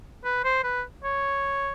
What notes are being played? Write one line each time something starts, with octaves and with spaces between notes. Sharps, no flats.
B4
C5
B4
C#5